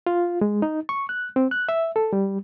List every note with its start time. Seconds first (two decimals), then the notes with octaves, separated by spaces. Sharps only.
0.06 F4
0.41 G#3
0.62 D#4
0.89 C#6
1.09 F#6
1.36 C4
1.51 F#6
1.69 E5
1.96 A4
2.13 G3